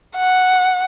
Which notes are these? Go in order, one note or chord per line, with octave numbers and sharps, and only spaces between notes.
F#5